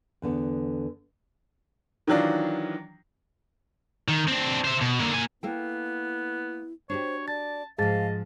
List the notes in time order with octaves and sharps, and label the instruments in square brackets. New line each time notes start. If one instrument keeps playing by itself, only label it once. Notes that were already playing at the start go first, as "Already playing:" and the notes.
[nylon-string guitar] E2 D3 B3
[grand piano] D#3 E3 F#3 D4 F4
[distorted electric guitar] D#3
C4 D4
C5 E5
B2
D3 A#3
A#3 G#5
[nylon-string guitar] A#3 A4 G5 [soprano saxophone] B3 [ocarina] E4
[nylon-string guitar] D4 F#4 G4 [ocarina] C5 [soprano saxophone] C#5
[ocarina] D5 [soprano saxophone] A5 [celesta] A6
[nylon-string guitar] G#2 F3 [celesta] G#4 A5 A6 [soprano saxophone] D#5 [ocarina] F5